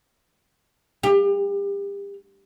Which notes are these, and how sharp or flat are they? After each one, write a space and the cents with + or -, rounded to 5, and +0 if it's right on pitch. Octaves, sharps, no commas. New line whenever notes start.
G4 +35